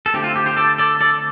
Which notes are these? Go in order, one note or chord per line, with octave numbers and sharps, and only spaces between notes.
A4
D3 A3 C4 G4
F4
G4
G4 C5
A4 D5
A4 D5
A4 D5